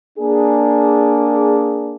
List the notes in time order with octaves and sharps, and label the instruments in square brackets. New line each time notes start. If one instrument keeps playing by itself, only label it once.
[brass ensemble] A#3 D4 G#4